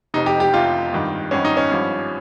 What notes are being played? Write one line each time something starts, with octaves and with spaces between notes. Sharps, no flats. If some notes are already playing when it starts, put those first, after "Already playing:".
F1 F2 C3 D#4
G4
G4
F1 F2 C3 F4
G#1 G2 D#3
G#1 G2 D#3 C#4
D#4
C#4
G#1 G2 F3